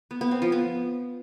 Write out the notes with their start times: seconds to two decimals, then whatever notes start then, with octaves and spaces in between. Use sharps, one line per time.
0.11 B3
0.21 B3
0.31 C4
0.42 F3
0.52 B3